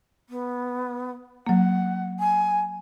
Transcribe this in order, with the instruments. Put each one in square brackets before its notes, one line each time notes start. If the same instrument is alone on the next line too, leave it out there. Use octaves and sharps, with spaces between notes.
[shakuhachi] B3
[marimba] F#3 A#3 [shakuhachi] F#5
[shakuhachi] G#5